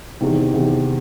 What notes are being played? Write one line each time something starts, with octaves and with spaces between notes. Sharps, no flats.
E2 C3 D#3
E2 C3 D#3